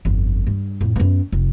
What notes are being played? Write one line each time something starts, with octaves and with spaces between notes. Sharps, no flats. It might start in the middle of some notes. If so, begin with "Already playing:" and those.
G1 F2
G2
F2 A2
F#2 B3
F1